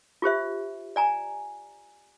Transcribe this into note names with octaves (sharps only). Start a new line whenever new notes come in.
F4 G4 C5 E5
D5 G#5 A#5